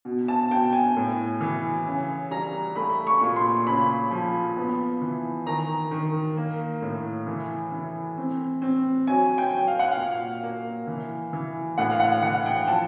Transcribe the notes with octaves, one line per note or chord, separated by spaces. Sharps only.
B2
A5
B2 G5
G#5
A2
E3
C#3
G3 A#5
A3 B5
C#6
A#2
C6
C#3 B5
F3
B3
E3
D#3 A#5
D#3
A#3
A2
E3
E3
C4
C4
F#3 G#5
G5
F#3
F5
F#5
A#2 F5
A#3
E3
E3
A2 F#5
F5
F#5
E3 F#5
G5
F3 A5